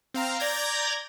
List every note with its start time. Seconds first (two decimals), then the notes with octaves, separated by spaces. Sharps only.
0.14 C4 F5 A#5
0.40 D5 A#5 G6 G#6 A#6